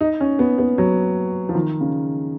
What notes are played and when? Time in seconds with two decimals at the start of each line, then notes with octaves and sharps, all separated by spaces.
0.01 D#4
0.20 C#4
0.39 B3
0.58 B3
0.78 F#3
1.49 F3
1.55 D#3
1.81 C#3